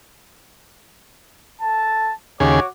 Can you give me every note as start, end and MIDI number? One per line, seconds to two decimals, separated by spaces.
1.61 2.12 69
1.61 2.12 81
2.40 2.60 39
2.40 2.60 49
2.40 2.67 66
2.40 2.60 68
2.40 2.67 73
2.40 2.67 86